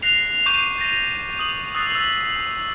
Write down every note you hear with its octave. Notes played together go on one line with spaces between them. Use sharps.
F#6 A#6 C7 F7
C#6 D6 G6 C7 D#7 E7
A6 A#6
D#6 F#7
D#6 E6 F#6 A6 C7
D#6 E6 A6 B6